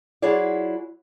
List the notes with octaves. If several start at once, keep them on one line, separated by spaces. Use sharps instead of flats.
F#3 E4 F4 G#4 C#5 D5